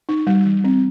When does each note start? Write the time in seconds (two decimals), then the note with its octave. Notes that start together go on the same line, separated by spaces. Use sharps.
0.09 D#4
0.27 G3
0.45 E3
0.64 C4